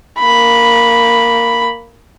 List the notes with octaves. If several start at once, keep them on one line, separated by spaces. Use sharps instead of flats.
A#3 B5